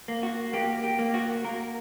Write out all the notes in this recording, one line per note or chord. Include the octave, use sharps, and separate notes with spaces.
A#3
F#4
A#3 G4
G4
A#3
F#4
A#3 A#4